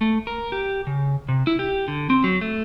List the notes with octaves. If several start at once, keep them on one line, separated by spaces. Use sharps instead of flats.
A3
A#4
G4
C#3
C3
E4
G4
D3
C4
F#3
A3